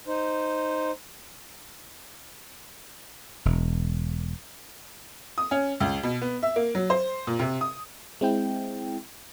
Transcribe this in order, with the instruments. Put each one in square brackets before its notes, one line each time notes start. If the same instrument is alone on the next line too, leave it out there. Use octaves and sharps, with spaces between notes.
[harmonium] D#4 C5
[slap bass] E1
[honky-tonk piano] D#6
C#4
C#2
B2
B3
E5
A#3
F#3
C5
A#2
C3
D#6
[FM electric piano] G#3 C4 E4 G5